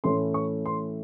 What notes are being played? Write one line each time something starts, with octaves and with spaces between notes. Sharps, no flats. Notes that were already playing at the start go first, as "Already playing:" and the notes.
A2 E3 A3 C#4 E4 C6
C#6
C6